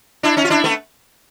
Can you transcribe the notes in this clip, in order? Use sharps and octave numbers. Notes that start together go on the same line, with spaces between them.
D4 E4
C#4 D#4
F4
D4 E4
A3 B3